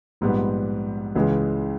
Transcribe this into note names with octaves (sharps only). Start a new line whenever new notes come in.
A#1 G#2 G3 B3
C#2 C#3 E3 G#3